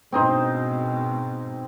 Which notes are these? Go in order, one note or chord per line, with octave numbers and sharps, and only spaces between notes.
G#2 B2 C4 D#4 C5